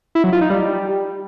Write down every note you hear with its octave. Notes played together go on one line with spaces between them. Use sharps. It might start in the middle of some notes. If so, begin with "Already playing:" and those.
E4
F#3
F4
D#4
G3